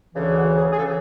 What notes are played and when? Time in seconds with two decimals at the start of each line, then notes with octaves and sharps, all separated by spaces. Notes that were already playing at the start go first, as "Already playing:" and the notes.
0.14 D2 C#3 E3
0.28 G#4
0.35 F#4
0.56 G#4
0.72 G#4
0.78 C#3 E3 A4